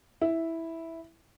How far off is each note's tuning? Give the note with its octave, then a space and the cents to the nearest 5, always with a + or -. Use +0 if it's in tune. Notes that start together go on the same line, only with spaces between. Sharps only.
E4 -5